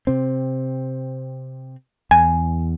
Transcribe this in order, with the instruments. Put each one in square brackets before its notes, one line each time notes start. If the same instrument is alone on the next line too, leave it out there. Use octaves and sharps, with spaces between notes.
[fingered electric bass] C3 C4
[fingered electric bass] E2 [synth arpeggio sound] G#5